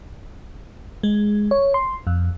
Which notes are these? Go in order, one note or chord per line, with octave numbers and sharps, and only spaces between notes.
G#3
C#5
C6
F2